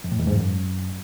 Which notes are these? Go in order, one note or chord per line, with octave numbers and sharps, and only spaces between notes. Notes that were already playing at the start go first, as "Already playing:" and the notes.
F2
A2
E2
G#2
F#2